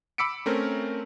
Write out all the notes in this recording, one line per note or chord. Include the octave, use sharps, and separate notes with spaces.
B5 D6 E6 B6 C#7 D7
A3 C4 C#4 A#4